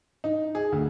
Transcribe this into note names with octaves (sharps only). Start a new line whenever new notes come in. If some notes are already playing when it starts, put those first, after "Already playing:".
D#4
G#4
D2